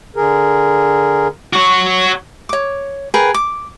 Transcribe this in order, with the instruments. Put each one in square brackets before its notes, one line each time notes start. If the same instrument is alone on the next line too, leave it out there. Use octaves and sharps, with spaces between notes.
[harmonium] D3 G#4 A#4
[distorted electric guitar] F#4 C#5
[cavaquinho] C#5 D6
G#4 A#4 B4 G5
D6